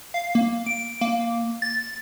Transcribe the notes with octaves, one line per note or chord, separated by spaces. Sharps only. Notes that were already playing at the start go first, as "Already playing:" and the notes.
F5
A#3
D7
A#3
A6